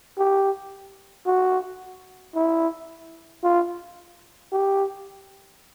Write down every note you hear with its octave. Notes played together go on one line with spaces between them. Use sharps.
G4
F#4
E4
F4
G4